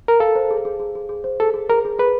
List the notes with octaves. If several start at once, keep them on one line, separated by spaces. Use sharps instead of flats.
A#4
A4 F5
C5
G#4
G#4
G#4
G#4
G#4
C5
G#4 A4
G#4
G#4 A#4
G#4
G#4 B4